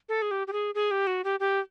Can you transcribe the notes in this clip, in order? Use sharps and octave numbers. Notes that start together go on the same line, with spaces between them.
A4
G#4
G4
G4
G#4
G#4
G4
F#4
G4
G4